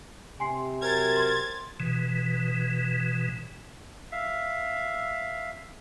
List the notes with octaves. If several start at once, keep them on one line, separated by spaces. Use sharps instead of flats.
C3 G#5 C6 C7
F#3 A#4 C5 G#6 A6
C6
B2 E3
E5 F5